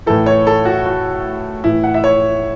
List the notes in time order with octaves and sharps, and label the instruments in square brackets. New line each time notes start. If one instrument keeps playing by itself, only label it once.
[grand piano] A2 E3 A4
C#5
A4
F#4
F#4
A2 E3 E4
F#5
E5
C#5